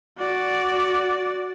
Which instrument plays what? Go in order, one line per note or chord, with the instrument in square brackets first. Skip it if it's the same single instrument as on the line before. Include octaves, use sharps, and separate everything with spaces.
[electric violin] F#4 D5